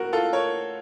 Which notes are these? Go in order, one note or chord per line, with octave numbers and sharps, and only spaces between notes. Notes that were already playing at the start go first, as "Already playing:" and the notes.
Already playing: A2 F#4 A#4
F4 A4
A#4 C#5